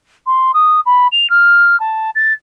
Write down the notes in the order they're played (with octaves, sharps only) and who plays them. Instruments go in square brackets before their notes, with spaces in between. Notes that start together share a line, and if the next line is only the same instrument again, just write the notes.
[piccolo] C6
D#6
B5
F7
F6
A5
A6